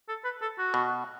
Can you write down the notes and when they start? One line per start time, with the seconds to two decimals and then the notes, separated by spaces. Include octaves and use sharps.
0.09 A4
0.24 B4
0.42 A4
0.58 F#4
0.74 B2